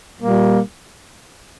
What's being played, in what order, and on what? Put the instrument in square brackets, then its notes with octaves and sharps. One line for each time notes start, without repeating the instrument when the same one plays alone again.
[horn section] A#2 G3 A#3